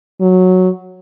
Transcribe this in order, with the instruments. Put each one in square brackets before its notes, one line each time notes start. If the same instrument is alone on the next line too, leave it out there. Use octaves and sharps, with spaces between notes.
[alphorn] F#3